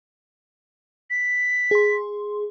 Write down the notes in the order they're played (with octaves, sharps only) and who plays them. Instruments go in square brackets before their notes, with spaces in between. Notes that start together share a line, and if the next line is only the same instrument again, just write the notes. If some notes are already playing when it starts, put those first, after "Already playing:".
[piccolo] B6
[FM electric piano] G#4 C6